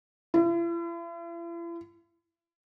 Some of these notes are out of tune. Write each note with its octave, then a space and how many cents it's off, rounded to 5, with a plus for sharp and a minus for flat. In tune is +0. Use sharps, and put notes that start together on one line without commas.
E4 +45